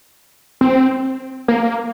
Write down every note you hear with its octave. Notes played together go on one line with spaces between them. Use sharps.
C4
A#3